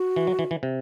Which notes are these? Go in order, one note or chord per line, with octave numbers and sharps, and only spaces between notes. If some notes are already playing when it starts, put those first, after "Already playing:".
Already playing: F#4
E3
F#3
E3
E3
C3